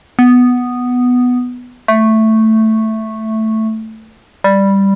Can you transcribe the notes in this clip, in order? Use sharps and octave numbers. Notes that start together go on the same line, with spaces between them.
B3
A3
G3